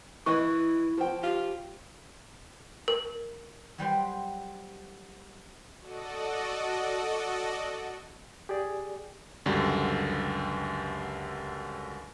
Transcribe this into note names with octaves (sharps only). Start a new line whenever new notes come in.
E3 E4 B4 D#5 C#6
F3 G5
F4 G4
A#4
F#3 G3 B4 C5
F#4 A4 D5 D#5
G4 G#4 D5
C#2 F#2 D3 F#3 G3